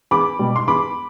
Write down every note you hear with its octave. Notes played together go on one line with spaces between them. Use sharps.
E2 B5 D6
B2 G3
C6
E2 B5 D6